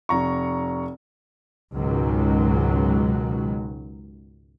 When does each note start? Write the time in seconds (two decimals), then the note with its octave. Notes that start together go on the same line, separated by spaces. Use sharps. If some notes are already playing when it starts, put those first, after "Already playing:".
0.09 F1 A#5 C#6
1.74 C#2 G#2 B2 D#3 F#3